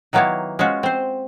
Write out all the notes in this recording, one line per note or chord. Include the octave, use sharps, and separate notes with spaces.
D#3 F#3 A#3 B3 E4 C#5
G#3 C#4 F4 F#4
C4 C5